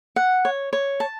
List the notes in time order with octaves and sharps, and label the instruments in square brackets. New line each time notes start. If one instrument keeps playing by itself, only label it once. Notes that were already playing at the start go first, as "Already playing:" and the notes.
[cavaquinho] F#5
C#5
C#5
A5